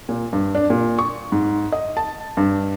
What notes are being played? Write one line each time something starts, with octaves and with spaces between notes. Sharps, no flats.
A#2
G2
D4
A#2
C#6
G#2
D#5
A5
G2